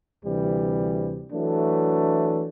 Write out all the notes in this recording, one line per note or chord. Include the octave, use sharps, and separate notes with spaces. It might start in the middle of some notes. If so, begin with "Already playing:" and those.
D2 C3 E3 G3
E3 F#3 A3 D4